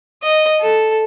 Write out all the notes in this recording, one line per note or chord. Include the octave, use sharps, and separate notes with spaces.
D#5
A4